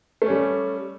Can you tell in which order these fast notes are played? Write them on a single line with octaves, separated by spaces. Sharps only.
A3 C#4 G3